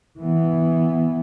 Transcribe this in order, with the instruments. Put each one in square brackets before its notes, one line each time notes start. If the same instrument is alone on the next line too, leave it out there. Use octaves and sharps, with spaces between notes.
[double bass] E3 B3